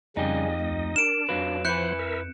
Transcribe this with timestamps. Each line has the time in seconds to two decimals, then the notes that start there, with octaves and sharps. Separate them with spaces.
0.17 F2 C#3 G3 C#4 D#4 G4 D#5
0.60 D2
0.96 D4 A#4 D7 E7
1.29 F2 F#3 F4 B4
1.65 F3 E4 B4 C5 F#5 F#6 G6 C#7
1.99 A#4 E5